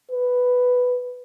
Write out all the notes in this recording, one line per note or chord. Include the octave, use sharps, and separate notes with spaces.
B4